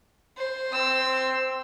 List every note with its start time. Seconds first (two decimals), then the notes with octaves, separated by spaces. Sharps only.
0.38 C5
0.73 C4 E6